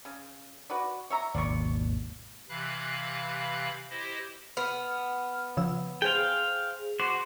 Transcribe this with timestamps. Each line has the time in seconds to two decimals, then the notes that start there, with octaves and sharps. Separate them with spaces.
0.05 C#3
0.70 F#4 B4 D5
1.10 C#5 E5 A#5
1.34 G#1 D#2 B2 D5 C#6
2.49 C3 E3 F5 B5 F#6
3.90 E4 G4 C5 D#5
4.57 B3 F6
5.57 C#3 F3 E6
6.02 G#4 C5 F5 G5
7.00 F#4 C5 D6